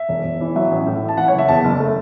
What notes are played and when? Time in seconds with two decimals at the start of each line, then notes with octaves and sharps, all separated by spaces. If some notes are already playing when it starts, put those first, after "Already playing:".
Already playing: E5
0.09 E1
0.24 E1
0.40 E3
0.55 F#3 E5
0.71 A1
0.87 A2
1.02 A1
1.09 A5
1.17 E3 F#5
1.28 C#5
1.33 F#1
1.38 E5
1.48 E2 A5
1.64 F#1
1.80 A3